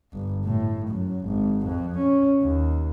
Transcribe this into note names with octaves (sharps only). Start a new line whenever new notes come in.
G1
A2
F#2
G#1
F2
C#4
D#2